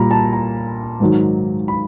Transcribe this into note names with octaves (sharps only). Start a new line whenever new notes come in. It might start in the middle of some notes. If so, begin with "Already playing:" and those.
Already playing: A#2 G3 A#5 B5
A5
A#5
G#2 D#3 F#3
B5